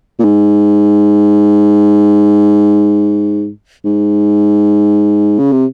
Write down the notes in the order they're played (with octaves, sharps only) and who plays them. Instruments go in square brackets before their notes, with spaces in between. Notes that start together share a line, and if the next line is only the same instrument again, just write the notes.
[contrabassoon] A#2
G#2
G#2
C#3
C3